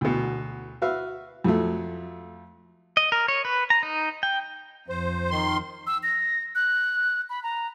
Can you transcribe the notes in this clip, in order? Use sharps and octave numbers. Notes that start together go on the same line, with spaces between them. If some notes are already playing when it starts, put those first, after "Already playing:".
D2 B2
F#4 B4 E5 F5
F2 F#3 A3
D#5
A#4
C#5
B4
A#5
D#4
G5
F2 C5
D#3 C6
E6
A#6
F#6
B5
A#5